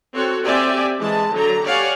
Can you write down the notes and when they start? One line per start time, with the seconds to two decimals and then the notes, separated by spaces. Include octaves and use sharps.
0.14 C4 F#4 A4 C#5
0.44 C4 G4 D5 E5 G#5
1.00 E3 G#3 A5
1.33 D3 F#3 A#5
1.64 G4 C#5 D5 F5 F#5 G#5